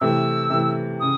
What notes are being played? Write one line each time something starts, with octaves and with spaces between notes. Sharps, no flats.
C3 E3 A3 E6
C3 E3 A3
C#3 D#6